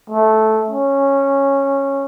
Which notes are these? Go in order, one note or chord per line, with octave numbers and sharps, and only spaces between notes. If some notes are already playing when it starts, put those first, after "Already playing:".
A3
C#4